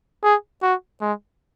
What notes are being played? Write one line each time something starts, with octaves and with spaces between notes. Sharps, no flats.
G#4
F#4
G#3